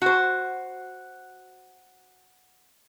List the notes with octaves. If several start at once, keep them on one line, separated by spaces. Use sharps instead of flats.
F#4 C5